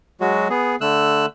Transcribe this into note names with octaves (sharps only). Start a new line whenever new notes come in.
F#3 G#3 F#4
B3 G#4
D3 A3 E6 F#6